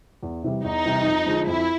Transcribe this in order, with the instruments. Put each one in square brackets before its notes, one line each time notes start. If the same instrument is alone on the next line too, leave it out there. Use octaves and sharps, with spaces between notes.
[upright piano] E2
C3 E3 G3
[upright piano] E2 [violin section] D#4
[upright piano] C3 E3 G3
F2
D3 F3 G#3
[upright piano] F2 [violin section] E4